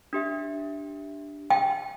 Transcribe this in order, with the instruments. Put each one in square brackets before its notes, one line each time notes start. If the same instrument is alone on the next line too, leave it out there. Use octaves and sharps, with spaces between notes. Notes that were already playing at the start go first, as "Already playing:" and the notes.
[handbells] D4 G4 E5
[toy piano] G5